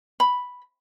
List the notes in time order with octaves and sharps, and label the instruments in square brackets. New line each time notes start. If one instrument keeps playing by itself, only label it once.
[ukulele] B5